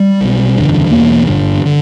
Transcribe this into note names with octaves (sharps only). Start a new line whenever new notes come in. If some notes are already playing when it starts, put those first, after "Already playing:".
Already playing: G3
B1 B2
F#1 E2 D3
E1 E2 B2 A#3
G1 G2 D3
D3